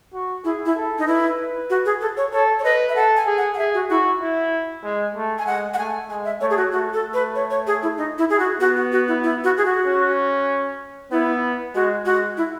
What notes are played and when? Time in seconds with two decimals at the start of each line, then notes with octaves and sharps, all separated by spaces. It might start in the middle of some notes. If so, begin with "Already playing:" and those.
0.13 F#4
0.44 E4 G#4
0.66 E4
0.76 A4
0.99 D#4
1.07 E4 B4
1.70 F#4
1.86 G#4
2.01 A4
2.17 C#5
2.33 A4 C#5
2.59 C#5
2.64 B4 D#5
2.89 E5
2.95 A4 F#5
3.17 G#5
3.27 G#4
3.38 F#5
3.54 F#5
3.58 G#4 E5
3.74 F#4
3.90 E4 F#4
4.22 E4
4.84 G#3
5.15 A3
5.39 G#5
5.46 G#3 F#5
5.74 F#5
5.78 A3 G#5
6.09 G#3 G#5
6.25 E5
6.41 A3 C#5
6.50 G#4
6.57 F#4
6.72 A3 F#4
6.93 A4
7.03 A3
7.14 B4
7.35 C#5
7.51 C#5
7.67 G#4
7.83 E4
7.97 D#4
8.18 E4
8.30 G#4
8.39 F#4
8.60 B3 F#4
8.76 F#4
8.92 F#4
9.08 E4
9.24 E4
9.44 F#4
9.57 G#4
9.65 F#4
9.86 C#4
11.11 B3 E4
11.75 G#3 F#4
12.05 G#3 F#4
12.37 E4